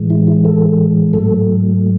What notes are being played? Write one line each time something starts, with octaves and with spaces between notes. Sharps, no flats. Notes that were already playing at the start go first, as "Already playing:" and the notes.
Already playing: A2 E3 G#3
E4
E4
A4
G#2 F#3 A3 A4